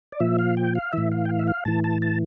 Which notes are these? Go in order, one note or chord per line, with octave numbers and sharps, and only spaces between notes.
D5
A#2 F3 E5
F5
G5
F5
A2 E3 E5
F5
G5
F5
E5
F5
A2 E3 A5
A5
A5